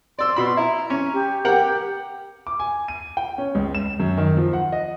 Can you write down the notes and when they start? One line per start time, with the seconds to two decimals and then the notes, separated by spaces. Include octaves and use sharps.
0.19 D5 C6 E6
0.36 B2 B5 C6
0.57 E4 A#5
0.90 C#4
1.13 G4
1.45 G4 A#4 F#5 G5
2.47 D6
2.60 G#5
2.88 D#7
3.17 G5
3.38 C#4
3.55 C#2
3.75 E7
4.00 F#2
4.17 D#3
4.37 F3
4.53 F#5
4.72 D#5